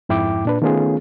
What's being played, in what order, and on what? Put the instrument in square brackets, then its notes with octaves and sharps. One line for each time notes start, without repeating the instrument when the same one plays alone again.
[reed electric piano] F2 G#2 E4 G5 D6
A#2 D4 B4
D#3 A3 B3 C#4 F4 G#4